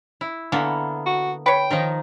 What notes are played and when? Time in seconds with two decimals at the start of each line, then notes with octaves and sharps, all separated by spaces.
0.21 E4
0.52 D3 E3 A#3 B3
1.06 F#4
1.46 B4 C#5 G5
1.71 D#3 F3 D#4